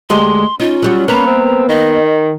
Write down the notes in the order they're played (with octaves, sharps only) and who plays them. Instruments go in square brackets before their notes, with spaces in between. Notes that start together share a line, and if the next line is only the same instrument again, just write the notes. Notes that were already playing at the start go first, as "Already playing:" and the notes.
[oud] D2 G#3 G4 [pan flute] C6
[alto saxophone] C#4 [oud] D#4 [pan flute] F4
[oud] F#3 G3 F#4
[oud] A#3 B3 B4 [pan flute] A#5
[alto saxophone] C4
[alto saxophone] D#3 [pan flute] D#5